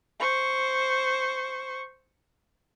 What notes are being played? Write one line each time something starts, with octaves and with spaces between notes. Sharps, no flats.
C5 C#6